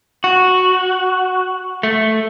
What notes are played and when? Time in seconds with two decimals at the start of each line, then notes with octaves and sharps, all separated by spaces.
0.24 F#4
1.83 A3